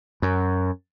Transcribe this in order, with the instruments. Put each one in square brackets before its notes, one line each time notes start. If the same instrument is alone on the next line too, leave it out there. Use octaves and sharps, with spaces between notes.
[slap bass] F#2